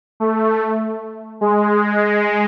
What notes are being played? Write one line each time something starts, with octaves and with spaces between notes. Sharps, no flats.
A3
G#3